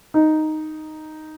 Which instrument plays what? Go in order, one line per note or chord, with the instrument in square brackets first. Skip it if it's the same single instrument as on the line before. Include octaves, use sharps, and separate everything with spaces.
[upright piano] D#4